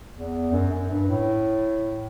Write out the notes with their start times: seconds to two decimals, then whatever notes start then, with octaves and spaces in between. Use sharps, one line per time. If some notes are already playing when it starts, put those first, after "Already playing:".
0.15 E2
0.52 F#2
0.71 F#2
0.90 G2
1.09 A2